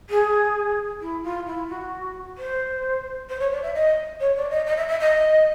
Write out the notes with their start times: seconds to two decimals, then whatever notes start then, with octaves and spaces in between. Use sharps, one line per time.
0.10 G#4
1.01 E4
1.23 F4
1.47 E4
1.69 F#4
2.38 C5
3.29 C5
3.40 C#5
3.52 D5
3.63 E5
3.74 D#5
4.20 C#5
4.36 D5
4.50 D#5
4.66 D#5
4.77 E5
4.88 E5
5.00 D#5